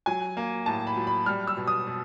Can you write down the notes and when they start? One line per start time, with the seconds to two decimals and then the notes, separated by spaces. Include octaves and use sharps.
0.06 F#3 G#5
0.37 A#3
0.66 A2 A5
0.87 B5
0.97 F#3
1.07 B5
1.26 G3 F6
1.47 E6
1.57 B2
1.67 D#6
1.87 B2